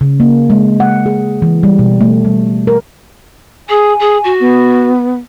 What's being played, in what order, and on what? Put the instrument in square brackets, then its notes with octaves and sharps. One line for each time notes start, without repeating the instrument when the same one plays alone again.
[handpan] C#3
A#3
G#3
F#5
G#4
E3
G3
B2
A3
G3
A#4
[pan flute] G#4 [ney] G#5
[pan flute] G#4
F#4
[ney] B3